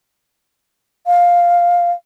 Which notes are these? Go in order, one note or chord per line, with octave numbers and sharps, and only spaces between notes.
F5